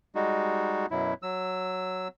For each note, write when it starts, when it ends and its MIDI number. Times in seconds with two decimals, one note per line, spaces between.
0.15 0.86 55
0.15 0.86 56
0.15 0.86 63
0.15 0.86 66
0.91 1.14 42
0.91 1.14 47
0.91 1.14 54
0.91 1.14 64
1.23 2.08 54
1.23 2.08 88